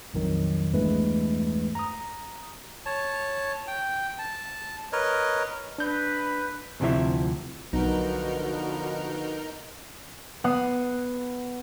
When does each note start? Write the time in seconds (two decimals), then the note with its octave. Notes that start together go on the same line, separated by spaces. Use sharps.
0.14 A#1 F2 D#3 F#3
0.73 E2 G2 E3 G#3 A3 B4
1.75 A#5 D#6
2.86 C#5 A5
3.67 G5
4.19 A5
4.93 A#4 B4 C#5 D#5
5.78 D4 B4 G6
6.80 D2 C3 F3 E4 E5
7.73 B1 D3 F3 B3 D#4 F#4 A#4
10.44 B3 F#5 D#6 C7